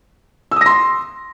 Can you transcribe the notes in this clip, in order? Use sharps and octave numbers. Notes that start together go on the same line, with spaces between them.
C6 D#6 E6 A#6